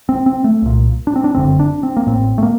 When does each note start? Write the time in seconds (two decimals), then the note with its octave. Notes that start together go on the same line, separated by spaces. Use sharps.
0.09 C4
0.26 C4
0.44 A3
0.62 C2 A#2
1.07 D4
1.16 C4
1.24 D4
1.35 G1 F#2 D3 C4
1.59 D4
1.83 C4
1.96 A#3
2.06 A1 A2 C4
2.38 A3
2.43 A#3